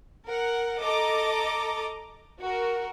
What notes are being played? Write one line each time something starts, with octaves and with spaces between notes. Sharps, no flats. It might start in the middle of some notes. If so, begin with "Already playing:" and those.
A#4 F#5
A4 D#5 A#5 D6
F#4 A#4